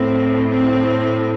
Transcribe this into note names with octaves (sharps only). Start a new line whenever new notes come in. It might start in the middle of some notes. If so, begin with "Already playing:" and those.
Already playing: A2 C4
C4